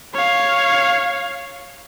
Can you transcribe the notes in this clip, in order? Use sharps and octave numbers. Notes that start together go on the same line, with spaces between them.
C#5 F5